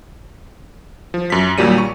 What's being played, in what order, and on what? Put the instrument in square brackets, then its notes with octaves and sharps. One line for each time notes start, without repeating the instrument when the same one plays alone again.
[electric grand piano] F3
F#2 B6
D#2 A#2 F#3 G3 D#7
C#6